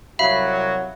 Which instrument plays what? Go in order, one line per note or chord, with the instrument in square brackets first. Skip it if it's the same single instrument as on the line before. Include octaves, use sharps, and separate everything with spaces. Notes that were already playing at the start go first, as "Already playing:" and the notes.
[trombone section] C2 F#3 F#4 [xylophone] E5 F5 B5